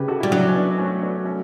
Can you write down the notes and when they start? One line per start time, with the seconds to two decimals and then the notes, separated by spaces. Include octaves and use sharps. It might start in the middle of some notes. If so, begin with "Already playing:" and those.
Already playing: C#3 G4 B4
0.08 F#4 A4
0.20 G3 E4
0.32 F#3 D4 F#4
0.48 C#4
0.55 B3 D4
0.78 A3 C#4
1.02 B3 D4
1.25 A3 C#4